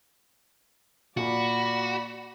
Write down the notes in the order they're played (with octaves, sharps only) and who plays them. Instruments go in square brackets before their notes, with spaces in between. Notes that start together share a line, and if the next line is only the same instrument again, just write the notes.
[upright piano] A#2 [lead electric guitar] F#4 [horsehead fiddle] D5 B5